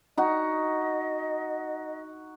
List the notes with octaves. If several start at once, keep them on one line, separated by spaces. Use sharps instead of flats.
D#4 F#4 D#5